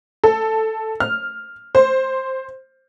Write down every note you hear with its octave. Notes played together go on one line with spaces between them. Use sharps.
A4
F6
C5